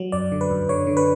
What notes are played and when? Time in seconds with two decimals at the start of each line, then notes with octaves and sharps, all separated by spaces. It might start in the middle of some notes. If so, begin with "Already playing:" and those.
Already playing: F#3
0.12 F#2 D5
0.32 D3
0.41 B4
0.50 F#2
0.69 D3 C#5
0.87 D3
0.97 B4